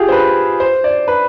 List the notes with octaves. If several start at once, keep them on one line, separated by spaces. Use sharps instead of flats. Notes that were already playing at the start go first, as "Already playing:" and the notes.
Already playing: F4 G4 G#4
C5
B4
C5
D5
B4